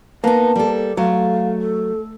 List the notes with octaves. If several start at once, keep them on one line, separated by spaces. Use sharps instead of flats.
A#3 B3 D#4 A5
G3 A4
F#3 A3 F5
A4